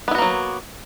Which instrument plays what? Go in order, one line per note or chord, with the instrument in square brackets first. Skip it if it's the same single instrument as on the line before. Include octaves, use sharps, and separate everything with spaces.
[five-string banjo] B3
E4
F#4
A#3
F#3